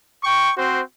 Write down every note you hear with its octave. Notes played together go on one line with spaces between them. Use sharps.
G5 C#6
C4 F#4 C5